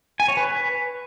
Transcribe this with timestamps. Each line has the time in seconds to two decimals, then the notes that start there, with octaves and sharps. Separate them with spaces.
0.20 G#5
0.28 C#5
0.37 B4